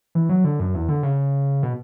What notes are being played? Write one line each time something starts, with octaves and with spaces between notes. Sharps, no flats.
E3
F#3
D3
F#2
E2
D3
C#3
B2